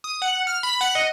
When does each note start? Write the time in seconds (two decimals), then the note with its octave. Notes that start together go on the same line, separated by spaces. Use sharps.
0.04 D#6
0.22 F#5
0.47 F6
0.63 B5
0.81 F#5
0.95 D#5